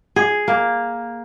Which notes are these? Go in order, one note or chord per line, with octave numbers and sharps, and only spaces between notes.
G#4
A#3